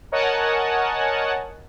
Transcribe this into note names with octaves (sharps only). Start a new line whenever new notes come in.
A#4 C#5 D#5 F#5 G#5 A5